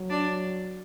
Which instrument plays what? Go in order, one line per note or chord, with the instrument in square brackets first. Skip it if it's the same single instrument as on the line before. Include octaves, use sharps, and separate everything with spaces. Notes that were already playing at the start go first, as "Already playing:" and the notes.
Already playing: [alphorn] F#3
[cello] D4